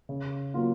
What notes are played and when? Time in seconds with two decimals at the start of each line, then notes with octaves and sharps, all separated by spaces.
0.09 C#3
0.54 F#3 A#3 F4